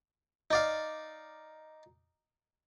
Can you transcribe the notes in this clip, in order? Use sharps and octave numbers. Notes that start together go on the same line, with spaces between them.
D#4 D5 F5